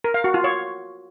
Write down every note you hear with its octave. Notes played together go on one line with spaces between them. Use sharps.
A#4
F5
F#4
F4
C#5